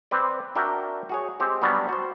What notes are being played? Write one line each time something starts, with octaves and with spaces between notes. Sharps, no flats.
C4 B4 D5
D4 F#4 A#4 E5 G5
F#4 G#4 C#5
G#3 C4 G4
F#3 G3 B3 C#4 D4 F#4
F#4 C5